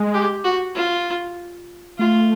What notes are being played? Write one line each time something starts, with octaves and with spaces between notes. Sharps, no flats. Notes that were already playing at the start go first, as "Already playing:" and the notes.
Already playing: G#3
G4
F#4
F4
A3 F4